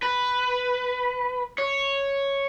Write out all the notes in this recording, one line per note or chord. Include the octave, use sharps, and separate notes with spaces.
B4
C#5